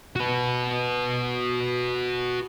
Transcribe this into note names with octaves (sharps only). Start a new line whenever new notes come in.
F#4 B4